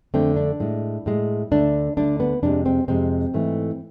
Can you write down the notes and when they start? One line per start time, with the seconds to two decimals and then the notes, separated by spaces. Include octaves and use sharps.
0.14 F2 D3 A3 C4
0.36 D4
0.60 A2 G#3
1.06 A2 G#3
1.51 D2 D3 A3 D4
1.97 D2 D3 A3 D4
2.20 B3
2.43 F2 C3 G#3 D4
2.66 C4
2.88 F2 C3 G#3 C4
3.34 G#2 E3 A3